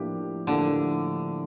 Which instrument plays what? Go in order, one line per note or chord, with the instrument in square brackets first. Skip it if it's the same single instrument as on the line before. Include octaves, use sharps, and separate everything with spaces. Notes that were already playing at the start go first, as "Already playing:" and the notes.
Already playing: [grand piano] A2 F3 A#3 D4 G4
[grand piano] A2 F3 A#3 D4 G4 [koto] D3